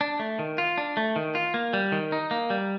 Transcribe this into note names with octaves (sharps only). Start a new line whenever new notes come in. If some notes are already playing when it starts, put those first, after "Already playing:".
D4
A3
D#3
F4
D4
A3
D#3
F4
A#3
G3
D#3
D#4
A#3
G3